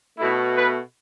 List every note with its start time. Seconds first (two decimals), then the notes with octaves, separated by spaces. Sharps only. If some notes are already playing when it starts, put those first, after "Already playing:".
0.18 B2 A3 E4
0.56 B4